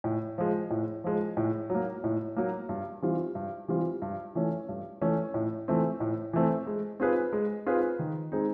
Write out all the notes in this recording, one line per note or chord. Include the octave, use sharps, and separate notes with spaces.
A2
F3 G#3
A2
F3 G#3
A2
F#3
A#3
A2
F#3 A#3
G2
E3 G3 C4 F4
G2
E3 G3 C4 F4
G2
E3 A3 C#4
G2
E3 A3 C#4
A2
E3 A3 C4
A2
E3 A3 C4
G#3
C4 F4 G#4 B4
G#3
C4 F4 G#4 B4
D#3
G#3 C4 D#4 G#4